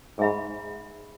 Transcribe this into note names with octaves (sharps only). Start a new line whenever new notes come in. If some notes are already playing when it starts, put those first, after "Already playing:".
G#2 G#4 E5 B5